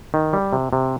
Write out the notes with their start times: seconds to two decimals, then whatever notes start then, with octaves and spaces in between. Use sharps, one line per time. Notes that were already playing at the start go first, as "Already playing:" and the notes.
0.14 D#3
0.33 G3
0.53 C3
0.73 C3